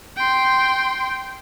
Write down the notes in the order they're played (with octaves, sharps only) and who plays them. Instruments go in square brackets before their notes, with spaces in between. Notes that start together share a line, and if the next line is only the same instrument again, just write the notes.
[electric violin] G5 C6